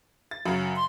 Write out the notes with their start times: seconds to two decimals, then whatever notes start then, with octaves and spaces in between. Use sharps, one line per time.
0.31 A6
0.46 F#2 C#3
0.75 C6